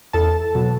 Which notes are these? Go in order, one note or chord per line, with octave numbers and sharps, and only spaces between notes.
E2 A4 A5
B2 F#3